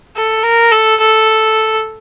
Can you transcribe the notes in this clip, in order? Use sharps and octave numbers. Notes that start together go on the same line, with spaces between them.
A4
A#4
A4
A4